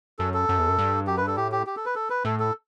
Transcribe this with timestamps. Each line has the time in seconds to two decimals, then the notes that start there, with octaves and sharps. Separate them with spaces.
0.19 F#2 A4
0.34 A4
0.49 F#2
0.59 E2
0.69 F#2
0.78 G2
1.07 F#2 G4
1.17 B4
1.22 G2
1.27 A4
1.37 A2 G4
1.52 G4
1.67 G4
1.77 A4
1.86 B4
1.95 A4
2.10 B4
2.25 A2 A4
2.40 A4